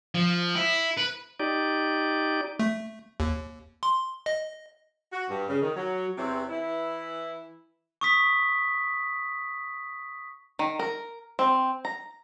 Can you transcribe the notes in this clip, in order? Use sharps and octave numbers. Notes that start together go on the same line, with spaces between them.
F3
E4
B4
D#4 G4 D5
A3
D#2
C6
D#5
F#4
G2
C#3
D#3
F#3
E2 C3 E3 C4 G4 C#5
E3 E4
C#6 D#6 B6
D#3
A#4
C4
A#5